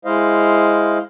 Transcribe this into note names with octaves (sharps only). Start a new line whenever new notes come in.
G#3 E4 C5 D#5 F5